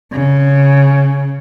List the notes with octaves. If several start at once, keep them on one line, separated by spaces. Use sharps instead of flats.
C#3